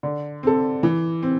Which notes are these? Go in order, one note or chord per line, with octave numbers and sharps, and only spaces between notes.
D3
C4 A4
E3
C4